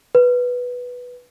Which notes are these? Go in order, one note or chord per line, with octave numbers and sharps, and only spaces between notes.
B4